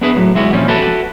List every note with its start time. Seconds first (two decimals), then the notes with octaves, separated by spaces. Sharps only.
0.01 B3 D4 E4 G#4 B4 E5
0.15 A2 F#3
0.35 E3 G#3 E4 F#4 G4
0.53 A#2 F3 G3 C4 C#4
0.68 E4 F#4 G4 A4 B4